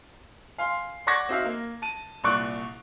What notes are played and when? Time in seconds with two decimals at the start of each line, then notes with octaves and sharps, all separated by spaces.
0.58 F5 G#5 C6
1.07 D5 F#5 C#6 D6 G#6 A#6
1.29 C4 D#4 F#4 E5 F5
1.45 A#3
1.82 A5 D#7
2.24 C2 A#2 D5 C#6 F#6 D7